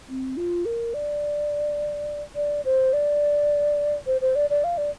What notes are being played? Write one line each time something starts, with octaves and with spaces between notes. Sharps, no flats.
C4
F4
A#4
D5
D5
C5
D5
C5
C5
D5
D5
F5
D5